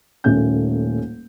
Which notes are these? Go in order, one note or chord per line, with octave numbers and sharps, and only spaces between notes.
D#1 A3 A#3 C#4 G6